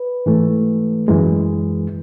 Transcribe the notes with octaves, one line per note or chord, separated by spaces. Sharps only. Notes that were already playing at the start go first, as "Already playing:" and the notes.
Already playing: B4
G#2 E3 A3
F#2 E3 G#3